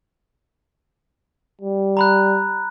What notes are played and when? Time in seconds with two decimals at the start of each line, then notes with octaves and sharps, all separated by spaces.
1.61 G3
1.97 A#5 B5 F#6